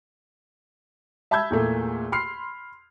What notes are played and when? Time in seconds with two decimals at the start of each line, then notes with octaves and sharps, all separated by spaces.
1.31 E5 A5 B5 E6 G6 G#6
1.50 E2 A#2 A3
2.12 B5 C6 F6 C7